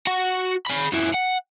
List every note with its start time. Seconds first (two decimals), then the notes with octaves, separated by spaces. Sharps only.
0.07 F#4 F#5
0.66 G#4 B5
0.92 F#2 E3
1.14 F#5